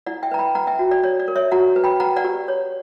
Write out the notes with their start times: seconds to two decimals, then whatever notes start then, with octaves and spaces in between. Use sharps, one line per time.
0.06 E4 D5 F#5
0.23 E5 G5
0.31 B4 A#5
0.39 G5 B5
0.55 B4 F#5 A#5
0.67 E5 G5
0.79 F#4
0.91 D5
1.03 C#5 D5
1.20 D5
1.28 A#4
1.36 C#5 E5
1.52 F#4 F#5 A#5
1.76 B4
1.84 G5 B5
2.00 B4 F#5 A#5
2.16 D5 F#5
2.25 G4
2.48 C#5